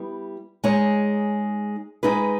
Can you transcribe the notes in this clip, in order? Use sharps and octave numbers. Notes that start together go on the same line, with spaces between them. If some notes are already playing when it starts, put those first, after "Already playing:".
Already playing: G3 B3 E4
G#3 D#4 G#4 C#5
G#3 D#4 G#4 B4